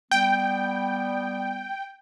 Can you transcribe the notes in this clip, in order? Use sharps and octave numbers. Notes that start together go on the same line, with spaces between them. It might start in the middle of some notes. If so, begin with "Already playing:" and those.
G3 B3 G5